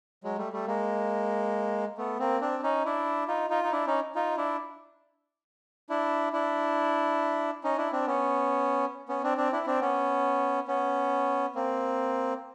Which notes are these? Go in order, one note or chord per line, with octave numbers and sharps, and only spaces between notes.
F#3 G#3
G3 A3
G3 A3
G#3 A#3
A3 B3
A#3 C4
C4 D4
C#4 D#4
D4 E4
D#4 F4
D#4 F4
D#4
D4 E4
C#4 D#4
D#4 F4
D4 E4
D4 E4
D4 E4
C#4 D#4
D4 E4
C4 D4
B3 C#4
B3 C#4
C4 D4
C4 D4
D4 E4
C4 D4
B3 C#4
B3 C#4
A#3 C4